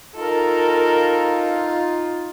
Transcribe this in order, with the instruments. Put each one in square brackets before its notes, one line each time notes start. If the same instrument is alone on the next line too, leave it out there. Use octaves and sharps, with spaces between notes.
[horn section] D#4 F4 [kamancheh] A4 A#4